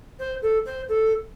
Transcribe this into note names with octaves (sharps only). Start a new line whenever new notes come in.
C5
A4
C5
A4